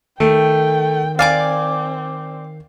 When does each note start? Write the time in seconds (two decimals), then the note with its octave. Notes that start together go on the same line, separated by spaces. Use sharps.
0.20 D#3 A3 G5
1.19 C4 D5 F5 G#5 D6